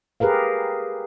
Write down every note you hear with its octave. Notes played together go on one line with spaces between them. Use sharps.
G4 G#4 A#4 B4 F5